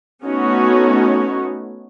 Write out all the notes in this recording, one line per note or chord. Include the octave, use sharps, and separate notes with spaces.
A3 B3 C#4 D#4 F#4 C#5